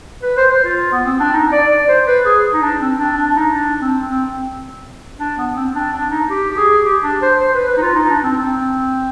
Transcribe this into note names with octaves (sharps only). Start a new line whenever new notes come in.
B4
C5
C5
F4
B3
C4
D4
D#4
D5
D5
C5
B4
G#4
D#4
D4
C4
D4
D4
D4
D#4
D4
C4
C4
D4
B3
C4
D4
D4
D#4
G4
G4
G#4
G4
D4
C5
C5
B4
B4
D#4
F4
D#4
D4
C4
C4